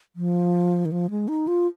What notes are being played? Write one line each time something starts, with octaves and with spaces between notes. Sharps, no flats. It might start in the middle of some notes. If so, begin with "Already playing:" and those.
F3
D#3
F3
G#3
D#4
F4